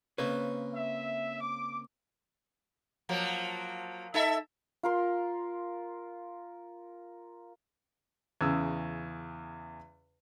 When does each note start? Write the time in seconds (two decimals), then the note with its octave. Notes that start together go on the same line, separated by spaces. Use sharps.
0.18 C#3 A#3 C4 B4 C#5
0.74 E5
1.41 D6
3.09 F3 F#3 A#3
4.14 D#4 A4 E5
4.83 F4 A#4 C6
8.41 E2 C#3 E6